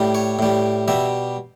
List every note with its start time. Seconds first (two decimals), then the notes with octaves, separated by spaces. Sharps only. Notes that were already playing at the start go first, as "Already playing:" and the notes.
Already playing: A2 G3
0.15 C#5
0.39 A2 G3
0.88 B2 G3 E5